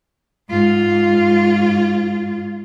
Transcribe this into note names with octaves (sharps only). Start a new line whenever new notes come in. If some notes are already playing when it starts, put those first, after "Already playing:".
G#2 F4